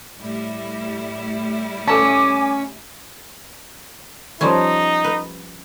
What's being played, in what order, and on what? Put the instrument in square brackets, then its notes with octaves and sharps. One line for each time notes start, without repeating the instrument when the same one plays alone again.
[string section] A2 G3 E4
[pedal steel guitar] C#4 [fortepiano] A4 A5 [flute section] G#5 D6
[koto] F3 G3 C#4 [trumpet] D#4
[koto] B4